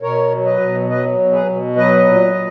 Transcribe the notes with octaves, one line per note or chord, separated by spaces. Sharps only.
B2 A#4 C#5
F#3
B4 D#5
B2
F#3 B4 D#5
B2
G#4 B4
B2
F#3 B4 D#5
A#2
A#2